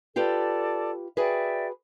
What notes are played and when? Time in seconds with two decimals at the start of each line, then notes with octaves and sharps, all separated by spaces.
0.16 F4 G4 A4 B4 D5 A5
1.17 F#4 G#4 B4 D5 E5 G5